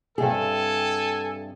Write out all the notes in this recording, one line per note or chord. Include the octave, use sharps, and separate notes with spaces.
G2 C3 G#4 A4 G#5